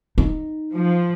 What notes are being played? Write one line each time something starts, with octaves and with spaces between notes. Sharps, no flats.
D#4
F3